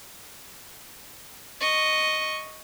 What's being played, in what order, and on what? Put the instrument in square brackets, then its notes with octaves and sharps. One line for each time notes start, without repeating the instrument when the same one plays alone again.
[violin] D#5 C#6